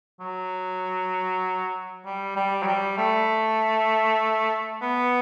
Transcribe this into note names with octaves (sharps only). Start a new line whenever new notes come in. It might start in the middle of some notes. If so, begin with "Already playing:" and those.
F#3
G3
G3
F#3
G3
A3
B3